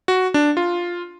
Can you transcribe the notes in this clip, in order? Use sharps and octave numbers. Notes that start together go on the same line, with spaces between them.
F#4
D4
F4